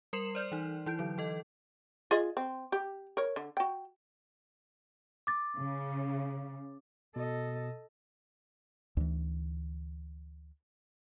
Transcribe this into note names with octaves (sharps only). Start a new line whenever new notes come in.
G3 A#4 C6 C7 E7 F#7
C5 D5 F6 G6
E3 D#4
E3 E4 G6 D7
D3 F#3
E3 A4 D#5
F4 G#4 D#5
C4
G4
A#4 C#5
D3
F#4 G5
D6 A6
C#3
B2 A4 D#5
D2 E3